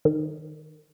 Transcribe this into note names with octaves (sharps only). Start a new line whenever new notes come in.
D#3